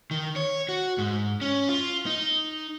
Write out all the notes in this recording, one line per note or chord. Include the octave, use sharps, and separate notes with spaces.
D#3
C#5
F#4
G#2
C#4
F4
D#4